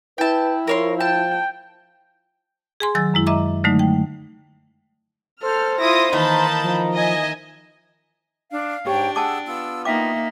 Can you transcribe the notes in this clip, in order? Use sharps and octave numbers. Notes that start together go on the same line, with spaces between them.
E4 B4 G5 A5
F3 A#4 C#5 C6
G5 A5
G#4 G#5 C6
D#3 F#3 G#5 E6 A6
F#2 G#3 E4
D#5 E5 A#5 D6
D3 F#3 G#3 A3 D#4
G5
A4 C5 F6
E4 F4 D#6 A#6
D#3 E3 A#3 D#4 A5 B5 G6
F3
D#5 E5 G#5
D4 F5
G#2 D4 G4 C#5 G5
G#4 F#5 G5 A5 D6 E6
B3 F4 E6
A#3 D#4 E5 G5 D6